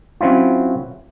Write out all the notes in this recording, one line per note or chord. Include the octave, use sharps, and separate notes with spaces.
F#3 C4 C#4 E4 F4